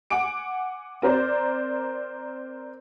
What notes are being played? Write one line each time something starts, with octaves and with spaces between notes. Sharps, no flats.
F#5 G#5 D6 D7
C4 A#4 C5 D5